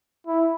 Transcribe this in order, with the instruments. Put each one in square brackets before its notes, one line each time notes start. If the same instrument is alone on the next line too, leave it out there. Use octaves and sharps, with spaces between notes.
[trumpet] E4